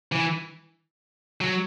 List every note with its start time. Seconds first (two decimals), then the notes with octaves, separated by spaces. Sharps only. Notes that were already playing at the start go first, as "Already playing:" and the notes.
0.12 E3
1.41 F#3